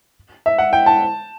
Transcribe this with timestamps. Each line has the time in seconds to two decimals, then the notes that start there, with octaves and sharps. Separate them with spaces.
0.46 E5
0.58 F#5
0.73 G5
0.86 A5